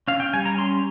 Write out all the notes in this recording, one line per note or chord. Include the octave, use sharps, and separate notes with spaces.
C#4 F5
G5
G3 G#5
A#5
C#4 C6